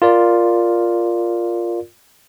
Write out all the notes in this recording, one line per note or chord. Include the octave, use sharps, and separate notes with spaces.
F4 A#4 D5